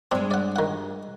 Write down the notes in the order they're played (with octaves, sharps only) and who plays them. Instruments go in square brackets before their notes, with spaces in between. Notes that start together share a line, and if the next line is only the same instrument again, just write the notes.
[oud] G2 G#3 [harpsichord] C4 D4
[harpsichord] D5 F#5
D#3 F#5